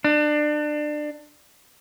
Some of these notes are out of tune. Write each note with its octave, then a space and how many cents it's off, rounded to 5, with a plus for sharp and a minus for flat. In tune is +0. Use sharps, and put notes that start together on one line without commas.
D4 +25